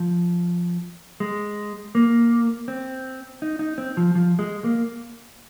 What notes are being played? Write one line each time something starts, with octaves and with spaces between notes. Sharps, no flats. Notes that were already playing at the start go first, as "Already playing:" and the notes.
Already playing: F3
G#3
A#3
C4
D#4
D#4
C4
F3
F3
G#3
A#3